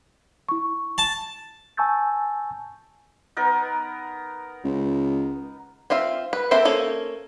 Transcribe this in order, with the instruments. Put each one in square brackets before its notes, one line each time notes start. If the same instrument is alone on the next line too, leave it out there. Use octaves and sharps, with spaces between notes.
[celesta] E4 C#6
[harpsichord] A5
[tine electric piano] G#5 A5 C#6 E6 G6 A6
[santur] B3 D#4 A#4
[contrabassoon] C#2
[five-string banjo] C4 F4 E5 F5
B4
A#3 C4 A4 C5 E5
A#3 C#4 A4